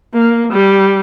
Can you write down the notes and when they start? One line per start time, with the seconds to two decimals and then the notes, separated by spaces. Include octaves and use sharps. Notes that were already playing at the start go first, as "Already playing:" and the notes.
0.14 A#3
0.53 G3